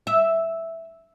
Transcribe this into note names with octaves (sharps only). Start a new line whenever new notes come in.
E5